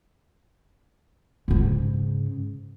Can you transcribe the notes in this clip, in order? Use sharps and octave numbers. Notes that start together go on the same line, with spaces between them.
G#2 C#3